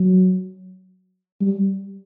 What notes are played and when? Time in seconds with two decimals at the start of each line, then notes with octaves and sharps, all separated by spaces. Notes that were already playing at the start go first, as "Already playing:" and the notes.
Already playing: F#3
1.41 G3